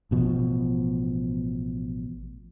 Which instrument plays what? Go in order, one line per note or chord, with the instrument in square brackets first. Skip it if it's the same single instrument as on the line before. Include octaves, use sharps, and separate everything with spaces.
[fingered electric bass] A1 B2 F3